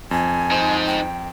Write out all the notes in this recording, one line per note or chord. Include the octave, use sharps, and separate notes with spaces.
F2 G#5
D#4 C5
G5